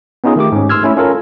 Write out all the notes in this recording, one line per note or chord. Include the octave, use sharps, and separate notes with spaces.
B3 C#4 D#4 F4 G#4
D#3 A3 G4 D6
G#2 C#4
C6 E6 F6 G#6
A3 C#4 E4
C#4 F4 A4 A#4